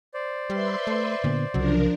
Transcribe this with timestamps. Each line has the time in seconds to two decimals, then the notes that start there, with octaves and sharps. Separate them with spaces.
0.14 C5 D5
0.50 G3 B4 E5 C6
0.87 A3
1.24 A#2 D3 B3
1.54 C2 C#3 F3 F#3 D4 A#4